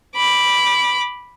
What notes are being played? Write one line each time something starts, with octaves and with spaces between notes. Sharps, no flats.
B5 D6